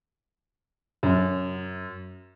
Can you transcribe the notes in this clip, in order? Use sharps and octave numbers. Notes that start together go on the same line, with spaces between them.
F#2